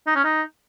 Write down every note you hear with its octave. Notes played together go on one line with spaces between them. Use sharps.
D#4
C#4
D#4